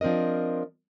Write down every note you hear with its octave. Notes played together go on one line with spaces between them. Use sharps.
F3 C4 D4 A#4 D#5